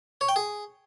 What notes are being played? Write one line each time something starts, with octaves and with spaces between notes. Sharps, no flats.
C#5
G5
G#4